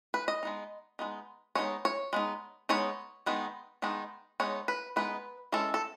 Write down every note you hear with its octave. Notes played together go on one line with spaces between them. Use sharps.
B4
D#5
G#3 B3 D#4
G#3 B3 D#4
G#3 B3 D#4 C#5
C#5
G#3 B3 D#4
G#3 B3 D#4 C#5
D#3 G#3 B3 D#4
D#3 G#3 B3 D#4
G#3 B3 D#4 C#5
B4
G#3 B3 D#4 B4
E3 G#3 C#4 A4
A4